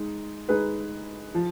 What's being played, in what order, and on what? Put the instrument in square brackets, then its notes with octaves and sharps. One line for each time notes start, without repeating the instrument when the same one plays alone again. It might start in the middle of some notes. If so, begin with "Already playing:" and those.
Already playing: [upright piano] G#3 D#4
G#3 D#4 G#4 B4
F3